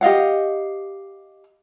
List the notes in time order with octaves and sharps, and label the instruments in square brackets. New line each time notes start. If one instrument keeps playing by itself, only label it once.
[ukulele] G4 D#5 F5 F#5